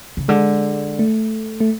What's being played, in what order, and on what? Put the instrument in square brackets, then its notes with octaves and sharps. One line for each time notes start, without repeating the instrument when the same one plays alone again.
[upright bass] C#3
[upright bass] D3 [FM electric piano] G#3
[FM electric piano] A3
A3